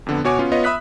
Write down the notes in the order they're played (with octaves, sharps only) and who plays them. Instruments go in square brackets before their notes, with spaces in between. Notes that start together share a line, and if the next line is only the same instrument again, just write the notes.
[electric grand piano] F2 D3 B3
B2 F#4 C#5 G#5 D6
B3 C#4 F4
B3 F4 B4 C#5 D#5
E5 B5 D#6 F#6 B6